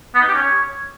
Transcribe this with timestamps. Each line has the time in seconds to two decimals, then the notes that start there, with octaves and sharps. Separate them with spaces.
0.15 B3
0.21 D#4
0.28 G4
0.35 C#4
0.41 C#5